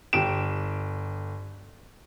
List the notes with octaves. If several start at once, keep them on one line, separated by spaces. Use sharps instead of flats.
G1 G4 D7 E7